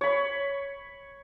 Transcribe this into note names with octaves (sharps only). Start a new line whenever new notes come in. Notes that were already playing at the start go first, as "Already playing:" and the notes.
C#5 B5